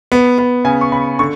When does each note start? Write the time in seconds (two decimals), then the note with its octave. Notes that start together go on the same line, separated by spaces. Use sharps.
0.12 B3
0.38 B3
0.64 C#3 G#5
0.81 C#6
0.92 C#3 B5
1.19 D3 C#6